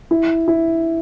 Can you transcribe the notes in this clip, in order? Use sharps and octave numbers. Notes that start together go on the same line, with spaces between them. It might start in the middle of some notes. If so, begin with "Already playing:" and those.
E4
E4